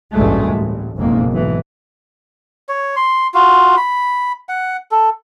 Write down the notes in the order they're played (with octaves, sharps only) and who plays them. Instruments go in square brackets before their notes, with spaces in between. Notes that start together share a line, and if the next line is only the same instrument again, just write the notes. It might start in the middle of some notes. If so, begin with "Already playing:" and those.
[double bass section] A1 D2 G2 A#2 G#3 A3
A1
F#1 B1 F2 G#2 A#3
B1 G#2 E3
[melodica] C#5
C6
F4 F#4
B5
F#5
A4